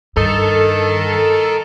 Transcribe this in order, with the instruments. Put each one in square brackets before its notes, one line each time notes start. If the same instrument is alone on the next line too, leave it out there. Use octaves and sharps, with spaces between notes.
[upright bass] G2 [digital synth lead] A4 [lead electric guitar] A#4 D#5